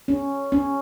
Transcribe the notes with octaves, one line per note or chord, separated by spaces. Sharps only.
C#4
C#4